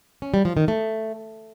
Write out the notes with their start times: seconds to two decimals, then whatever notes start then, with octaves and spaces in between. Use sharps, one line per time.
0.22 C#4
0.34 G3
0.45 F3
0.57 D#3
0.68 A3